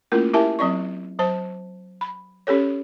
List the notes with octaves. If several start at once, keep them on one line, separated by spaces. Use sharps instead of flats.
A3 A#3 C#4 E4 F4 A#4
E4 G4 A#4 E5 G#5 A5
F#3 C4 D5 C#6
F#3 C5 A5
B5
C#4 G4 A4 C#5